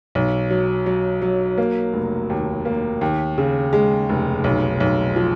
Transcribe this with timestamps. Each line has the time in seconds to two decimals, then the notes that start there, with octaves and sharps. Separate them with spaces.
0.15 B1
0.50 F#3
0.86 F#3
1.22 F#3
1.58 A#3
1.93 F1
2.30 D#2
2.65 A#3
3.01 D#2
3.38 C#3
3.73 G#3
4.09 F1
4.44 B1
4.80 B1
5.16 F3